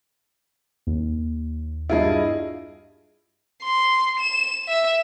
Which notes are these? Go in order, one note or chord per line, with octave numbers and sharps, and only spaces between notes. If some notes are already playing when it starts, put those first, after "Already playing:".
D#2
G2 E4 F4 G#4 D#5
C6
E7
E5